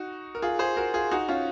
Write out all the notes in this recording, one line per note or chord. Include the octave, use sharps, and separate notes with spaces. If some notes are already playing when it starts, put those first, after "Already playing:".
Already playing: D#4 F#4
A#4
F4 G#4
G#4 C5
F#4 A#4
F4 G#4
D#4 F#4
C#4 F4